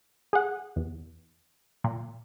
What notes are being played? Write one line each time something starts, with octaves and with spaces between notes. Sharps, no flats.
G#4 F#5
E2
A#2